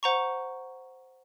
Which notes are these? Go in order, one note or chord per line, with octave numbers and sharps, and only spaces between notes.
C5 F#5 A#5 C#6